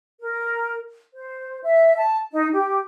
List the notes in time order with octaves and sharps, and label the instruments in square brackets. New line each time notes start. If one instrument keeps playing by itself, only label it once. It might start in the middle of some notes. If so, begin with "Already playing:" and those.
[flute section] A#4
C5
E5
A5
D#4
G4